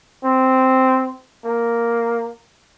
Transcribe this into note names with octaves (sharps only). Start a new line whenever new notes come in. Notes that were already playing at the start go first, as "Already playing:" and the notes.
C4
A#3